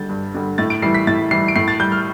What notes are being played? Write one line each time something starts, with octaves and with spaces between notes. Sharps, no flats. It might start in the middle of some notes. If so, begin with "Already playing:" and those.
Already playing: D3 G3 G6 A6
G2
D3 G3
A2 A6
D7
E3 G3 C7
B6
A2 A6
E3 G3 C7
D7
A2 C7
A6
G3 G6
F6